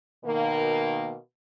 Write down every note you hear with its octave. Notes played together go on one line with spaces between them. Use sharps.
B2 D#3 A#3